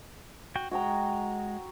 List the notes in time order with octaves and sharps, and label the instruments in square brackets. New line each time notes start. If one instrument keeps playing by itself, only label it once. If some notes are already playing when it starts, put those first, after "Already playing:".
[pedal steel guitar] F#4 G5
[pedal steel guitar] G#3 [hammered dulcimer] F#4 G5 A#5